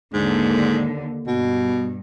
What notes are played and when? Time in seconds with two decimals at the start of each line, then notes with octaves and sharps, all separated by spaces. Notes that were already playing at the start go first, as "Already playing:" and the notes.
0.14 D#2 G#2 D3
1.27 G2 B2